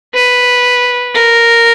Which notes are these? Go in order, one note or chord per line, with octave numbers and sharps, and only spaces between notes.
B4
A#4